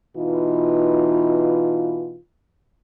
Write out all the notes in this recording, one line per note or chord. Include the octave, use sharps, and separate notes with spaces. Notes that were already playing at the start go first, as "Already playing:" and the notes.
B2 E3 D#4 F4